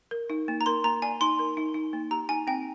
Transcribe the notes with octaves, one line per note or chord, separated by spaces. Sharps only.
A#4
D#4
A#3
A#5
A#4 C6
A#3 A#5
D5 G#5
D#4 C6
A#4
D#4
D#4
A#3
G4 A#5
D#4 G#5
C4 G5